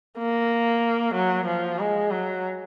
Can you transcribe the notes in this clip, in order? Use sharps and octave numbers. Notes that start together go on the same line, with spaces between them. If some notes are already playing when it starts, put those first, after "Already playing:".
A#3
F#3
F3
G#3
F#3